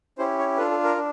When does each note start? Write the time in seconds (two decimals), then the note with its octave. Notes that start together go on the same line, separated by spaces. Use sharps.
0.18 C#4 E4 G4 C5
0.39 C#5
0.58 D4 F4 A4 B4
0.71 A4
0.84 A#4
0.97 D4